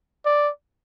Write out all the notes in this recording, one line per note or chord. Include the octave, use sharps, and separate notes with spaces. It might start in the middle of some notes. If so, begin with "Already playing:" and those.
D5